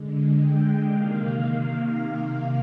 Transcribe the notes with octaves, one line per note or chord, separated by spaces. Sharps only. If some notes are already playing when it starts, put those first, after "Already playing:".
Already playing: D3 G#3
G5
C3 D#3 A#3 F5